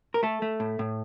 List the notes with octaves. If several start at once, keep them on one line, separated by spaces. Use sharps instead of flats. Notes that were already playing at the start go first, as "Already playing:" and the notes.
A#4
A3 A4
A3
A2
A2